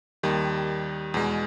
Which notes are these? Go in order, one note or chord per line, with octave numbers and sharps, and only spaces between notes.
D#2 D#3 G3
E2 B2 G#3